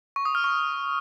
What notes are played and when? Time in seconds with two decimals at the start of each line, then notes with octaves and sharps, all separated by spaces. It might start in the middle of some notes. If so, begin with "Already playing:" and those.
0.16 C#6
0.25 D#6
0.35 F6
0.44 C#6